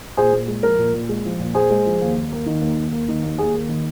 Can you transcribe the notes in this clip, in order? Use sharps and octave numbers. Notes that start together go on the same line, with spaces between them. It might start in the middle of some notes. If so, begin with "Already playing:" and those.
A#2 G#4 C5
A#2
G#3
F3 A#4
A#2
A#2
G#3
F3
A#2
A#2 G#4 C5
G#3
F3
D#2
D#2
A#3
D#3
D#2
D#2
A#3
D#3
D#2
D#2 G#4
A#3
D#3